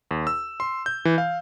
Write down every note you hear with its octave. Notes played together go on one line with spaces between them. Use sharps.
D#2
E6
C6
G6
E3
F5